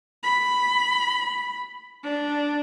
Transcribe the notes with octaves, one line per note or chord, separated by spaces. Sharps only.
B5
D4